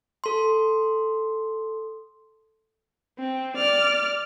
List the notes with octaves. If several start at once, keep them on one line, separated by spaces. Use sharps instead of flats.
A4 C6
C4
D5 F6